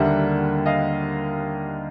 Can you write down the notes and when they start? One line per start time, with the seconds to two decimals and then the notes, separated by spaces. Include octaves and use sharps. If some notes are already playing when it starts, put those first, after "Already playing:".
Already playing: D#2 D3 G3 A#3 E5 F#5
0.66 D#5 F5